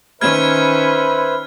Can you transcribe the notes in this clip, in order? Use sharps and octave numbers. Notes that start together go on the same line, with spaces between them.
D#3 C#4 B4 C5 E5 B5 F6 G#6